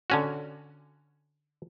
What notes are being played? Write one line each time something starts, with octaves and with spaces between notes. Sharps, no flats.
D3 C#4 F#4